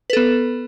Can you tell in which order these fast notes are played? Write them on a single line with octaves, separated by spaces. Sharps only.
B4 A4 B3